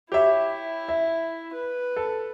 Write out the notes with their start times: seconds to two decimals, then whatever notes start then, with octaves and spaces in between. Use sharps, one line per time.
0.12 E4 G4 C#5 E5
0.89 E5
1.54 B4
1.96 A4